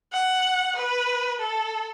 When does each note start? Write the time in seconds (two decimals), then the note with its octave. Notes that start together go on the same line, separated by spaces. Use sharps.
0.13 F#5
0.76 B4
1.40 A4